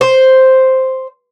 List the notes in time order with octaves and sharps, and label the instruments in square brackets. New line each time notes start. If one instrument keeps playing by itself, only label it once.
[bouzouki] C5